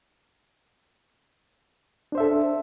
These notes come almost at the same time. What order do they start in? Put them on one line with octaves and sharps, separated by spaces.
D4 C5 E5 A4